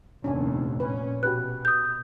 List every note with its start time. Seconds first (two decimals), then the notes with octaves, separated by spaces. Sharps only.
0.24 F1 D#2 A#2 C#4 D4 G#5
0.80 A#2 C#4 B4
1.23 B2 F#4 G4 B4 F#6
1.65 D#6 G6